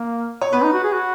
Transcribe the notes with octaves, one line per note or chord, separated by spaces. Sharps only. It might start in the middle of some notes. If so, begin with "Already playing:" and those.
Already playing: A#3
C#5
B3 B4
D#4
F#4
G#4
F#4